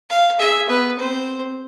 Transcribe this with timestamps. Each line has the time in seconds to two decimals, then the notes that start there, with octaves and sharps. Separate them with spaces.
0.10 F5
0.39 G#4 E5
0.69 B3 B4
0.99 C4 C5